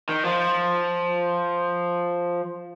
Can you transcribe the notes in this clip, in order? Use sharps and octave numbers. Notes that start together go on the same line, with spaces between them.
D#3
F3